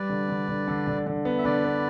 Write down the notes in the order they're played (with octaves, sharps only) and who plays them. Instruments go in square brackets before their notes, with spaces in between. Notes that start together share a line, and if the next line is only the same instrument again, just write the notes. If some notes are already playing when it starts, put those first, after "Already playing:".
Already playing: [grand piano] G3 [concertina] B4 D5
[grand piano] D3
D3
D3
D3
D3
D3
B3
[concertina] E5
[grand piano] D3 [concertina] B4 D5
[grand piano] B3